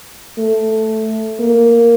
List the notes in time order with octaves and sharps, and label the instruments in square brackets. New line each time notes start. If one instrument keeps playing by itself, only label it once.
[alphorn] A3
A#3